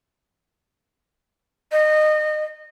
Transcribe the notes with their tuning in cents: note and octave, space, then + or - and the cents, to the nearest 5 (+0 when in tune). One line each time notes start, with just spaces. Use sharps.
D#5 -25